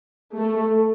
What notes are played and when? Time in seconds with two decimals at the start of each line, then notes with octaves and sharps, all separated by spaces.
0.36 A3